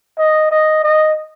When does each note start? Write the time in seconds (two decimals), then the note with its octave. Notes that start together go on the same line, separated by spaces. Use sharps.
0.18 D#5
0.51 D#5
0.84 D#5